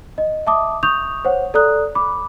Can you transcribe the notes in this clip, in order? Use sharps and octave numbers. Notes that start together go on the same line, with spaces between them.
D#5
E5 A5 D6 D#6
C#6 D#6 G6 F7
C5 C#5 F#5
A4 D5 A#5 D#6 F#6
B5 D6